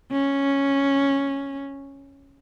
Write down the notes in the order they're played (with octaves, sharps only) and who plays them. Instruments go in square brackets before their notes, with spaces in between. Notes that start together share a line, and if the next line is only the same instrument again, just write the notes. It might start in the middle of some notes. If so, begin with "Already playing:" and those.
[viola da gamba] C#4